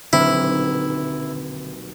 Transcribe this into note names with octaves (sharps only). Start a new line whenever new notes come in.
D#1 B1 D3 C4 E4 F6